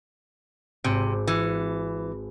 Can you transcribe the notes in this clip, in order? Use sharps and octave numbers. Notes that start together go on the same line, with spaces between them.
G#1 C3 C4 E6
E3 F#6 C#7